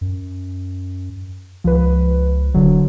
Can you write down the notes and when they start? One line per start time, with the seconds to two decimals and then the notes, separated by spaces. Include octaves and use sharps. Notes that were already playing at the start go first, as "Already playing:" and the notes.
0.01 F#2
1.64 C#2 F3 B4
2.54 D#1 D3 F#3